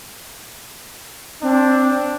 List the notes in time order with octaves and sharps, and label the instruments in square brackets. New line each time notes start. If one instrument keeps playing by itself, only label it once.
[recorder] C4 [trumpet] D4